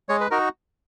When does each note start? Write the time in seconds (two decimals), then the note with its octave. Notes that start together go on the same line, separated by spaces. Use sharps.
0.09 G#3 C#5
0.21 B4
0.31 D#4 F#4 A#4